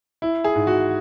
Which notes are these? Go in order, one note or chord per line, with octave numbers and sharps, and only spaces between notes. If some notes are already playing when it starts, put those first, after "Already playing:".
E4
G#4
G#2
F#4